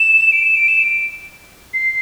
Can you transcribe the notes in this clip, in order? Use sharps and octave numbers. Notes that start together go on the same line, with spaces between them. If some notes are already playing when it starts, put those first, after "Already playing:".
Already playing: E7
D7
E7
D7
E7
D7
C7